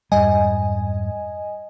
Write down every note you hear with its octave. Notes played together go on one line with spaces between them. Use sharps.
F2 G#2 G3 D#5 G#5